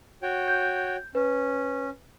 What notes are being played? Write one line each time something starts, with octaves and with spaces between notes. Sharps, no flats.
F#4 C#5 G5
G6
C#4 B4